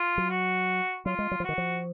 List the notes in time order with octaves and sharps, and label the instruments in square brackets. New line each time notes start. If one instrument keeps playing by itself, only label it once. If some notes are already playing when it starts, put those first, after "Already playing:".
Already playing: [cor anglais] F4
[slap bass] F#3
[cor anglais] F#4
[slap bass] F#3 [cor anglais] F4
[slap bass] G#3
F#3
F3
[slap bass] D#3 [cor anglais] F#4
[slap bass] F3